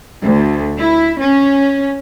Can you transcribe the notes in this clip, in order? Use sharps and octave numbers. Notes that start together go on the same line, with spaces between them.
D2
E4
C#4